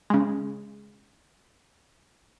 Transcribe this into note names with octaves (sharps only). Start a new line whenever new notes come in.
C#3 G#3